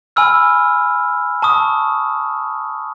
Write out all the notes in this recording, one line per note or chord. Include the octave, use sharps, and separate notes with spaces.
G#5 B5 E6 F6
A5 C#6 D#6